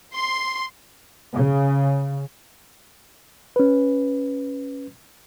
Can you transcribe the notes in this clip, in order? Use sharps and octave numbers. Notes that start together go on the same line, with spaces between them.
C6
C#3
C#4 B4